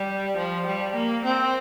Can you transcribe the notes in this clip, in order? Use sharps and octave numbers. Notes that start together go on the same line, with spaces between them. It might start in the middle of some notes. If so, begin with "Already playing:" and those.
Already playing: G3
F3
G3
A#3
C4